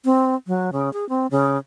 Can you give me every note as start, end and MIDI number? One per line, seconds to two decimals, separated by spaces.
0.05 0.35 60
0.47 0.70 54
0.73 0.92 49
0.93 1.07 68
1.09 1.27 60
1.31 1.57 49